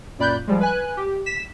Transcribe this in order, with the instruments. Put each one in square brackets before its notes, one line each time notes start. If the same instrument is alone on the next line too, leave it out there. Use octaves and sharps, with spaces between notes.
[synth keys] F#2 A#2 D5 B5 F#6 G6
F3 G3 G#3
B4 G#5 F#6
G4
B6 E7